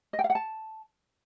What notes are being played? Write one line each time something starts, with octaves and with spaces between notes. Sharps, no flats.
D#5
G5
F5
F#5
A5